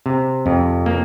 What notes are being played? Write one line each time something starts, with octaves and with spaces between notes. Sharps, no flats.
C3
F2
A#3